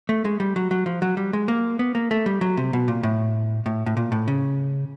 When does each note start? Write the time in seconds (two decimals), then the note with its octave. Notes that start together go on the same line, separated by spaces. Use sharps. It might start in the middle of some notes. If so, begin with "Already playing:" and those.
0.09 A3
0.25 G#3
0.40 G3
0.56 F#3
0.71 F#3
0.86 F3
1.02 F#3
1.17 G3
1.33 G#3
1.48 A#3
1.79 B3
1.95 A#3
2.11 A3
2.26 G3
2.41 F#3
2.57 C3
2.73 B2
2.88 A#2
3.03 A2
3.66 A2
3.86 A2
3.97 A#2
4.12 A2
4.28 C#3